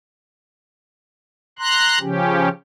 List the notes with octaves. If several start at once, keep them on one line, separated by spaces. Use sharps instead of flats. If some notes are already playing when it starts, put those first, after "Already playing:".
A#5 C6 F#6
C#3 F3 C#4 G4